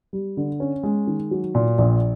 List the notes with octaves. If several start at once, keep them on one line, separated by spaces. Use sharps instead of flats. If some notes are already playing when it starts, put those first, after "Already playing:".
G3
D3
C#4
G#3
D#3
F#3
A#2
A#1